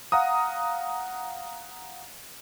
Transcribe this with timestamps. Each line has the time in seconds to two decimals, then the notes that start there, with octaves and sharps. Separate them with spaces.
0.12 F5 F#5 A#5 D#6